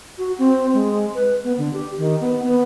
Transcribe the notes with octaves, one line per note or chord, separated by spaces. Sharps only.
F#4
C4
G#3
B4
B3
D3
G4
D#3
B3
B3